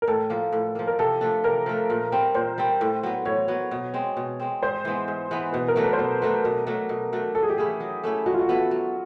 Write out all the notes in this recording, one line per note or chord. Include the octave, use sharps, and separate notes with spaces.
A#4
A2 A4
F3 A#3
A2
F3 A#3
A#4
C3 A4
F3 A3 D4
C3 A#4
F3 A3 D4
A#2
G3 C4
A#2 C5
G3 C4
A2
F#3 B3
A2 C#5
F#3 B3
B2
G#3 C4
B2
G#3 C4
G#2 C5
E3 G#3 B3
G#2
E3 G#3 B3
B2 B4
A#4
F#3 A3 D4
B4
C5
B2 B4
F#3 A3 D4 B4
B2 A#4
F#3 A3 D4
B2
F#3 A3 D4
F#3 A4
G#4
G4
A3 C#4 E4 G#4
F#3
A3 C#4 E4
F#3 F#4
F4
F#4
B3 E4 A4
F#3